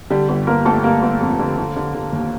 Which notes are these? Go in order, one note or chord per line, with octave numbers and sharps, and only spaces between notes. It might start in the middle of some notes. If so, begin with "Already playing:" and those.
D3 G3 G4
G1
G1 A#3 A#4
G1 A3 A4
G1 A#3 A#4
G1
F2
D3
D3
D3
D3
D#2